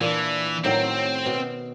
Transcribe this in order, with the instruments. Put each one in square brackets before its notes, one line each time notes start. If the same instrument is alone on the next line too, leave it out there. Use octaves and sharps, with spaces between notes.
[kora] A#2 D4 [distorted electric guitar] E3
[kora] A2 D#3 F#3 [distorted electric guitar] C4
[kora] B2